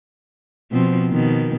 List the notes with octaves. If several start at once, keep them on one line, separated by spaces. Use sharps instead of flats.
B2 F3 C4
B2 D#3